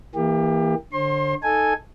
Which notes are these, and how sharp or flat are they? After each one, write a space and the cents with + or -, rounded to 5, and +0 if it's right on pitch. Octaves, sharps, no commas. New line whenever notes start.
E3 -10 A#3 +0 G4 +30
D3 +0 C5 +45 C6 +25
D#4 +0 A4 +0 G#5 +0